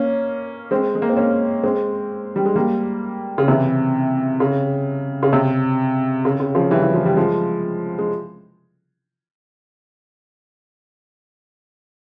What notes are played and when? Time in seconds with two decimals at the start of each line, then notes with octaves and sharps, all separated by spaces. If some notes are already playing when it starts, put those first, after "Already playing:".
Already playing: A#3 C#4
0.71 G#3 C4
0.95 G#3
1.02 A#3
1.09 C4
1.17 A#3 C#4
1.63 G#3 C4
2.36 G3
2.46 G#3
2.56 G3 A#3
3.38 C#3
3.48 C3 E3
4.40 C#3
5.23 C#3
5.33 C3
6.25 C#3
6.40 C#3
6.55 C#3 F3
6.70 E3 G3
6.82 E3
6.94 F3
7.05 G3
7.17 F3 G#3
7.98 G#3